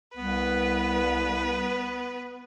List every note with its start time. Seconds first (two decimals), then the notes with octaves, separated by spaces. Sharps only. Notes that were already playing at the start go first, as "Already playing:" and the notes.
0.17 C2 B3 B4